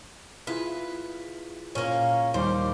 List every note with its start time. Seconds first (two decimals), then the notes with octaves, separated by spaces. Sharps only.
0.47 E4 F4 G#4 B4
1.75 A#2 A#3 C#4
2.34 D#2 G3 C5 D6